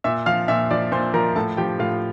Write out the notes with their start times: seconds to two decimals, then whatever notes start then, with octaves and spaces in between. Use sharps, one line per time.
0.04 A#2 E5 E6
0.26 F3 F5 F6
0.48 A#2 E5 E6
0.71 F3 D5 D6
0.92 A#2 C5 C6
1.14 F3 A#4 A#5
1.36 A2 A4 A5
1.57 F3 G4 G5
1.79 A2 F4 F5